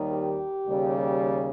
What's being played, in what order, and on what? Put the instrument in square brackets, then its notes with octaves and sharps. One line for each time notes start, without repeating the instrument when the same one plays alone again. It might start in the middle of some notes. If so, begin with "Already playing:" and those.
Already playing: [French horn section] D#2 D#3 G3
G4
D#2 C#3 G3